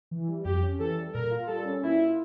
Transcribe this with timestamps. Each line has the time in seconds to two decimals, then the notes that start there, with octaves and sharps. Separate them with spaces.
0.11 E3
0.28 G3
0.45 F2 G4
0.63 C#4
0.80 E3 A4
0.97 G3
1.14 A#2 A#4
1.31 F4
1.48 G3 A4
1.65 C#4
1.83 A#2 E4
2.00 F4